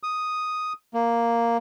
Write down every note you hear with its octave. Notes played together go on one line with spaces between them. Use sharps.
D#6
A#3